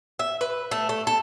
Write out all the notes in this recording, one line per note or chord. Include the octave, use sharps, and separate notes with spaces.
E5
B4
A3
A3
A4